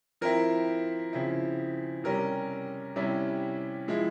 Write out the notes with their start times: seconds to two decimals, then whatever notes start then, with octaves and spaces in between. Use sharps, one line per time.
0.21 F3 C4 E4 A#4
1.13 C#3 F3 C4 E4
2.04 C3 G3 C#4 A#4
2.96 C3 G3 C#4 E4
3.88 F3 G#3 E4